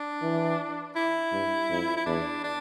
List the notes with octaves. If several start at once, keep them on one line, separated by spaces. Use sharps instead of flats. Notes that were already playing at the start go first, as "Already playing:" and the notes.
Already playing: D4
E3
E4
G2
F2
E4
E2 D4
D4